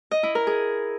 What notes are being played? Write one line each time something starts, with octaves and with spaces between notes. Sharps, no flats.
D#5
E4
A#4
G#4